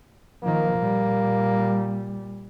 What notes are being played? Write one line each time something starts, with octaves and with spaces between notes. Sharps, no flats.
D#3 F3 A#3
A#2 G3